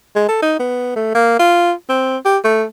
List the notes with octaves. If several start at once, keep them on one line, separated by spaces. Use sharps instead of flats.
G#3
A4
D#4
B3
A3
A#3
F4
C4
G4
A3